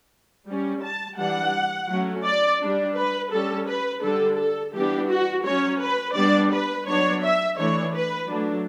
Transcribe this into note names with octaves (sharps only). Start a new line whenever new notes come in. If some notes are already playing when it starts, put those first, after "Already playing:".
G3 C#4
A5
E3 G3 D4 F#5
F#3 A3 C#4
D5
G3 D4
B4
G3 C#4 A4
B4
D3 G3 D4 A4
A4
E3 G3 B3 D4 G4
F#4
F#3 C#4 C#5
B4
G3 B3 D4 D5
B4
F#3 B3 D4 C#5
E5
E3 A3 D4 C#5
B4
F#3 A3 D4